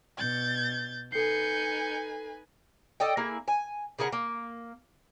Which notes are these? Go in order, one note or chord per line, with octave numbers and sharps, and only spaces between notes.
B2 G6 A6
D#4 A4 B4 G#5 G6 C7 C#7
A4 D5 D#5 G5
A#3 E4 G#4
G#5
C#3 G#4 A#4 F#5
A#3